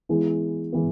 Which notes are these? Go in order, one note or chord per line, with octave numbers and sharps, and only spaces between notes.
E3 G#3 B3 E4
E3 G#3 B3 E4